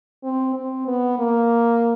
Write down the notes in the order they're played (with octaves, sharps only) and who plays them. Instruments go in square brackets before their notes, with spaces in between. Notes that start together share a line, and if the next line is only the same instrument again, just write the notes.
[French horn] C4
C4
B3
A#3